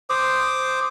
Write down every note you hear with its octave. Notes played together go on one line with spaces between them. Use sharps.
C5 D6 D#6